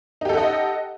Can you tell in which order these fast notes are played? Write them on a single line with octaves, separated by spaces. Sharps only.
D#4 G4 A4 F#5 D#5